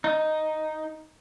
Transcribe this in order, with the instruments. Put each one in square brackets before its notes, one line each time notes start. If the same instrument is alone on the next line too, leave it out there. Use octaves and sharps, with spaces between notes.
[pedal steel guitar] D#4